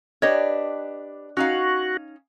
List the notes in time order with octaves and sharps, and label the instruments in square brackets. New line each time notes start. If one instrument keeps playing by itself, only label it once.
[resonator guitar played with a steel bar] D4 G4 B4 [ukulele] C#5 D#5
[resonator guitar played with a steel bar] C#4 D#4 F5 [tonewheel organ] F#4